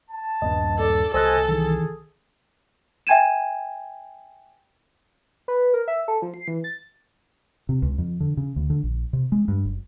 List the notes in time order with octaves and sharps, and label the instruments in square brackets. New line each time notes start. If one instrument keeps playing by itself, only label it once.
[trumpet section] A5
[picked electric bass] D#1 G2 B3 [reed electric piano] D#5
[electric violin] A4 [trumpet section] D5
[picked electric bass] C2 [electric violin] A4 [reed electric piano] C5 E6 F#6 [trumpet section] D#5 G#5
[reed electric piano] D#3 E3 [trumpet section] G#4
[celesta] E5 G5 G#5 G#6 D#7 E7
[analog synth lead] B4
A#4
E5
A4
F3
C7
E3
A6
[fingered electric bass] C3
C#2
F2
D3
C#3
D2
D3
A#1
C3
G#3
G2
F#1